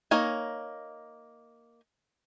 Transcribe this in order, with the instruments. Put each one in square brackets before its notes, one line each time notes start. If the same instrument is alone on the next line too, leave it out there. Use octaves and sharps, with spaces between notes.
[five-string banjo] A#3 D#4 C#5 D#5 G#5